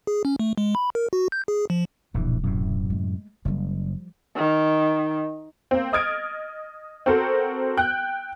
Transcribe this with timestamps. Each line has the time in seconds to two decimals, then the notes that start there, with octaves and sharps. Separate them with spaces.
0.07 G#4
0.25 C#4
0.39 A3
0.58 G#3
0.75 B5
0.95 A#4
1.13 F#4
1.32 G6
1.48 G#4
1.70 F3
2.14 D1 A#1 G2 B2 E3
2.43 F#2 A2 C3
2.90 G#3 A3
3.45 F#1 F3 G3
4.36 D#3
5.71 A#3 C4
5.93 D#5 D#6 F6 G#6 A6 D7
7.06 C4 F#4 A4 A#4 C5
7.77 G5 F#6 G6